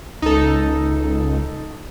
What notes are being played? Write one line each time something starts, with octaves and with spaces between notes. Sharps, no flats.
C#2 D#4 A4